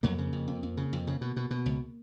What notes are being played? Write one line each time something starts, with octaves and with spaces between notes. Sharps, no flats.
F2 F#3 A#3
C#3
F2
F2
F2
C#3
F2
C#3
B2
B2
B2
C#2